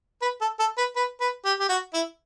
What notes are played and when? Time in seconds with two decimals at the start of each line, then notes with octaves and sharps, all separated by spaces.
0.22 B4
0.41 A4
0.59 A4
0.78 B4
0.96 B4
1.20 B4
1.45 G4
1.60 G4
1.69 F#4
1.94 E4